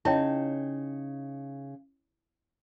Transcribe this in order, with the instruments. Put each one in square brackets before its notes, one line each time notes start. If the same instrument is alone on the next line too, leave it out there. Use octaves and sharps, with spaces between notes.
[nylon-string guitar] C#3 D#4 [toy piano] E4 C#5 G5